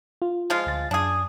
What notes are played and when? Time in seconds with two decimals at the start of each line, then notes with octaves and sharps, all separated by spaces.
0.22 F4
0.50 F3 G#3 F4
0.66 D2 A6
0.91 F#2 D4 G#4 D#6